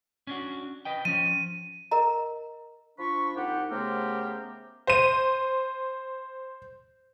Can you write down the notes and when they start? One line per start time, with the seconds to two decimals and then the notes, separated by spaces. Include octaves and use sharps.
0.27 C#4 D4 F#4
0.85 B4 D#5 G5
1.05 F3 C#4 D#7
1.91 A#4 D#5 A#5
2.99 F3 D4 F4 B5 C#6
3.36 C2 D#4 F4 G4 F#5
3.71 C#3 A3 B3 G4 A#4 C5
4.87 C5 D#7